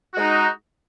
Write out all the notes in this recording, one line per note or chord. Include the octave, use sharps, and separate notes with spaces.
G#3 D#4 F#4